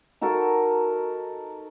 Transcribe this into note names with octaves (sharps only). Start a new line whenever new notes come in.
D#4 F#4 A4 A#4